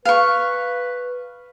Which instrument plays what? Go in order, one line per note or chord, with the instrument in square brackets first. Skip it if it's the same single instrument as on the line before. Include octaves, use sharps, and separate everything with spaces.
[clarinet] B4 [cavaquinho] F5 C#6